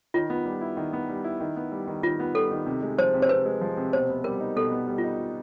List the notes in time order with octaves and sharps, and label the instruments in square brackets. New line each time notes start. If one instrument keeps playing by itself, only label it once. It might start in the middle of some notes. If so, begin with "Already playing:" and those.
[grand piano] D#3 [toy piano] F4
[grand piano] B3
G3
E4
D#3
B3
G3
E4
D#3
B3
G3
D#3
[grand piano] D#3 [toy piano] F4
[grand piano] B3
[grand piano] G3 [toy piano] A4
[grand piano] D#3
C3
G#3
[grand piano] F3 [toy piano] C5
[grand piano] C3
[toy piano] C5
[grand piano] C3 [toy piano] B4
[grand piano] G#3
F3
C3
[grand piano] B2 [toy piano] C5
[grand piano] B3
[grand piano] G3 [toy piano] A#4
[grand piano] D#4
[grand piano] B2 [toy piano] A4
[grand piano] B3
G3
[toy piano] F4
[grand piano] D#4